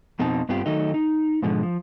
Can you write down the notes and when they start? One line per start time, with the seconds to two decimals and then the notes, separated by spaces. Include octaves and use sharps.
0.19 F2 B2 C4 D#4 A5
0.49 G2 B3 C4 F4 G4
0.66 D#3 F#3 A3 D#4 D#5
0.94 D#4
1.42 G#2 B2 D3 F3 G#3
1.63 F3